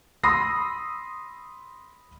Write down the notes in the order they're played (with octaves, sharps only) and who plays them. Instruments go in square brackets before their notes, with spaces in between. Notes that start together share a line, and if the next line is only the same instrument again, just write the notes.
[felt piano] B5 C6 D#6 E6 A#6 C7